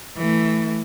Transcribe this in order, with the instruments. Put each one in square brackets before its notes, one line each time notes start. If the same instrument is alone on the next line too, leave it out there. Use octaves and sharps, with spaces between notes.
[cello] E3 A3